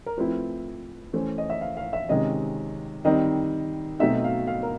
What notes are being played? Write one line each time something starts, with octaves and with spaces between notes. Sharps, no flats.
A#4
F3 A3 C4 E4 B4
E3 A3 C#4 C5
D#5
E5
F5
F5
E5
C3 D#3 G#3 C#4 D#5
D#3 G3 C4 D#4 D#5
B2 F#3 A3 C4 D#4 E5
F5
F5
A#4